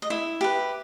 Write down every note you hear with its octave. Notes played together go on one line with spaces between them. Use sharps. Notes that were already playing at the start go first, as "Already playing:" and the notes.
D#5
E4 E5
G4 B4